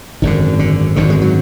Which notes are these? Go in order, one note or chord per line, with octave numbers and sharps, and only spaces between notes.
G#1 F#2 D3 D#3
D3
G#1 F#2 D3 D#3
G#3
F#3